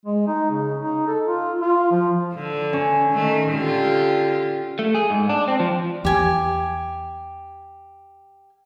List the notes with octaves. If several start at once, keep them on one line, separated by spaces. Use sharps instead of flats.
G#3
D#4
C#3
D#4
A4
F4
F4
F3
D3
C#4
D#3 A3
D3 F4 G4
A3
G#4
G#2
D4
C4
F3
E2 G4 G#5